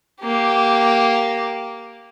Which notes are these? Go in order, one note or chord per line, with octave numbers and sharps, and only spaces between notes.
A#3 G4